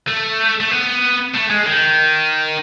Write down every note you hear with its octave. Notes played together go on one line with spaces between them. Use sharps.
A3
A3
B3
A3
G#3
D#3